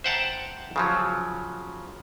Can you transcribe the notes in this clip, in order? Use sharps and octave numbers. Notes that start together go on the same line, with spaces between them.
C5 E5 F#5 G5 A5 A#5
C#3 F3 F#3